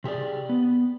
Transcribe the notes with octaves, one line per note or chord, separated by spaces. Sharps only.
C3 G4 G#4 D5
B3